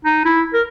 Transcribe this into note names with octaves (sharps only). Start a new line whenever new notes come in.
D#4
E4
A#4